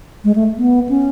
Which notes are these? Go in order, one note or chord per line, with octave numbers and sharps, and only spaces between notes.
G#3
A3
B3
C#4